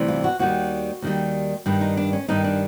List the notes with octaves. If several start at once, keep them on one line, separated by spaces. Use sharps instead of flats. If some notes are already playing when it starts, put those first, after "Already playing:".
Already playing: D2 C3 E3 G3
F4
F#4
D#2 D#3 G3 F#4
D#2 D#3 G3
G2 D#3 G3
D#4
D4
C#4
G2 D#3 G3 D#4
D4